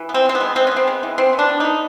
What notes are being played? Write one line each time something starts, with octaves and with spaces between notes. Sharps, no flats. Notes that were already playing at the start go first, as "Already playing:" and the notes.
Already playing: E3
B3
C4
G#3 C4
B3
G#3
G#3 C4
C#4
B3 C4
G#3
E3
E3 C4
B3
D4
B3
B3 D#4